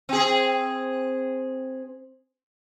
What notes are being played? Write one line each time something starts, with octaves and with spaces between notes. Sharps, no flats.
C4 G#4